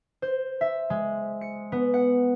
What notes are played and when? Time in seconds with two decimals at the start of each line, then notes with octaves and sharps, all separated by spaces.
0.22 C5
0.61 E5
0.90 G#3
1.41 C#7
1.72 B3
1.94 F#5